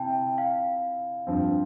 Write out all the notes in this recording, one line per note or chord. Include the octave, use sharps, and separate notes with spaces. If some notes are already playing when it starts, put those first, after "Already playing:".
Already playing: C3 E4 G5 A5
F5
G2 F3 C4